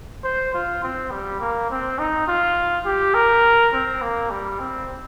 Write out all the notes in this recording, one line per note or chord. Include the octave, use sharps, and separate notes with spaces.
C5
F4
C4
G3
A#3
C4
D#4
F4
G4
A#4
C4
A#3
G3
C4